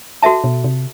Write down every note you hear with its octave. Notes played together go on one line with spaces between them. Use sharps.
F#4 A4 E5 A5
B2
C3